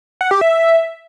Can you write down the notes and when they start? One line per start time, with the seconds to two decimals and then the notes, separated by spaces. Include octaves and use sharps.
0.21 F#5
0.31 G4
0.41 E5